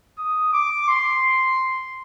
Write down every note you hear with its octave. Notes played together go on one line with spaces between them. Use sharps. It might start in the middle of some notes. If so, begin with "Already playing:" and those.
D#6
D6
C6